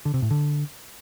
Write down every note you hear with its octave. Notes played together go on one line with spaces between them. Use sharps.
D3
C3
A2
D3